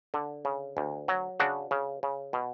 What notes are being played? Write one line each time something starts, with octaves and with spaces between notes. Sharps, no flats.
D3
C#3
D2
F#3
C#3 D4 F#4
C#3
C#3
B2